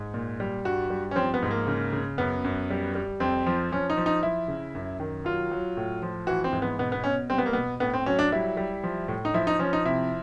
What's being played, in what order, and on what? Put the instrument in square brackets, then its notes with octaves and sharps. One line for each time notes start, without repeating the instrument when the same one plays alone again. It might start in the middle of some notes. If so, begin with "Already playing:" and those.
Already playing: [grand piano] G#2
A#2
G3
G2 F#4
G3
C#4
F3 C4
B3
G#2
A#3
C#3
C#3
F#2 B3
F#2
G3
G3
F2 C4
F3
F3 C#4
D#4
F3
D#4
F3 E4
C#3
F#2
D#3
F#3 F4
F#3
A2
F3
E3 F#4
C4
G#2
B3
B2 B3
B3
B2 C#4
G3 C4
B3
A#3
B2 B3
A2 B3
C4
F#3 C#4
D4
G3 E4
G3
F3
A2
D#4
F3 E4
D#4
F3 C#4
D#4
C3 E4